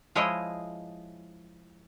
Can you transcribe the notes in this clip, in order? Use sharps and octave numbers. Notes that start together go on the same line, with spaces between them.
F3 G#3 E4 C#5 D#5